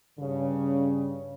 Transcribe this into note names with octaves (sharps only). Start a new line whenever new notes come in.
G2 C#3